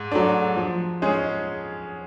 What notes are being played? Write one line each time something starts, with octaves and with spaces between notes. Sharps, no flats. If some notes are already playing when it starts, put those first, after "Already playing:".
Already playing: G#2
F#3 A3 D4
F3
G#3 C#4 G#4